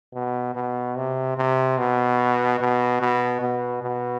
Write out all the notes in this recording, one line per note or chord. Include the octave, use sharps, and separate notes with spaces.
B2
B2
C3
C3
B2
B2
B2
B2
B2